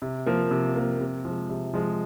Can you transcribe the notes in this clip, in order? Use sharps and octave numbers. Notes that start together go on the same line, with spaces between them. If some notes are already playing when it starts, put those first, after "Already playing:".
C3
F3 A#3
C3
F3 A#3
C3
F3 G#3
C3
F3 G#3